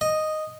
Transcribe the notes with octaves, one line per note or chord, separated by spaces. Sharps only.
D#5